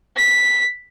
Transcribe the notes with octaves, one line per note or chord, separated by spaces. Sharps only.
B6